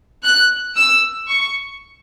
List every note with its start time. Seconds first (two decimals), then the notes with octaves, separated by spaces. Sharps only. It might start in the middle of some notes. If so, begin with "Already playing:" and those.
0.24 F#6
0.76 E6
1.28 C#6